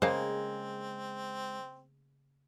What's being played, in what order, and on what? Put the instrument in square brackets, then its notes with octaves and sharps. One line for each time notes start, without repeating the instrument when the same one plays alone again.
[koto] C#3 A#3 [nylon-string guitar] G#3 [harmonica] C4 [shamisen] C5 F5